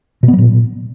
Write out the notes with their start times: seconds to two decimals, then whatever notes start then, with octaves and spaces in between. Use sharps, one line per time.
0.23 B2
0.28 B3
0.33 F#3
0.38 A#2